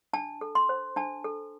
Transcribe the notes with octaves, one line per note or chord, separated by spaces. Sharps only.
D4 A5
A4
C6
C5
D4 A5
A4